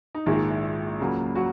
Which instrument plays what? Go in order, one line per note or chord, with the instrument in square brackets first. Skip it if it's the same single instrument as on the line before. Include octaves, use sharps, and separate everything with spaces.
[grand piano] D#4
A#1 G#2 D#3 G#3 E4
E4
C#2 C#3 F#3 A#3
F#3 F#4